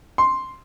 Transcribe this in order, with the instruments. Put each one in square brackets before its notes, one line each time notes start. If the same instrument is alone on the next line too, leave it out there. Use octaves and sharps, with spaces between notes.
[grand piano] C6